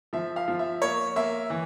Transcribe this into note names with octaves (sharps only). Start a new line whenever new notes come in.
F3 E5
F5
F3
E5
A#3 C#5
A#3 E5
E3